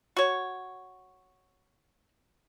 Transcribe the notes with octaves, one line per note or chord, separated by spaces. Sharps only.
F#4 C#5